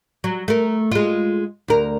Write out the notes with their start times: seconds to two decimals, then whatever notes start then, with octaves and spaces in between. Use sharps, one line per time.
0.24 F#3
0.48 A3 A#4
0.92 G#3 F4
1.68 D2 A#4